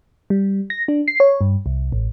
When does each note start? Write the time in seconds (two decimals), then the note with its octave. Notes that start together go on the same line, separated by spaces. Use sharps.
0.30 G3
0.70 A#6
0.88 D4
1.08 C7
1.20 C#5
1.41 G2
1.66 C2
1.92 A1